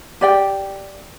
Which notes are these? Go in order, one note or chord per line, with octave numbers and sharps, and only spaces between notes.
G4 D5 G5